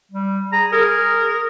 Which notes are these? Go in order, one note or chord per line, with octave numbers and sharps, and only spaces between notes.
G3
G#4 A#5
G#4 A#4